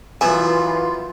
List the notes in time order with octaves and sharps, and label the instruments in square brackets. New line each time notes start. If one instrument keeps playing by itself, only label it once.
[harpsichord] F#2 B3 E5 [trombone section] E3 [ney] F4 [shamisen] G#5